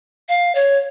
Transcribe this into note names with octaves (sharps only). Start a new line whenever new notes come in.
F5
C#5